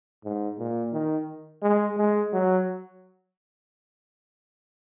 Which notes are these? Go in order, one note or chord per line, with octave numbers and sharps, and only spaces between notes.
G#2
A#2
D#3
G#3
G#3
F#3